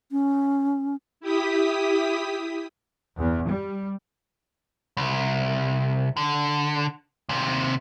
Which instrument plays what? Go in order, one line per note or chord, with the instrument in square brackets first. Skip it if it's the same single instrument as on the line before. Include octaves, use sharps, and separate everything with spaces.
[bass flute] C#4
[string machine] E4 G4 D#6 B6
[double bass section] E2
G3
[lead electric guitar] C2
D3
D#2 C3